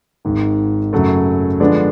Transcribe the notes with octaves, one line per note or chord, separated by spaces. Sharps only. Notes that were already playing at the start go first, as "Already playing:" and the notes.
G#1 G#2 D#3
F#2 C#3 F#3 A3
D3 F3 G#3 B3 D4